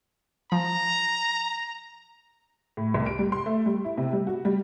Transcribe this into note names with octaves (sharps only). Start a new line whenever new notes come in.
F3 A#5
A2
C2
D7
G3
C6
A3
G3
E4
C3
G3
F#4
G3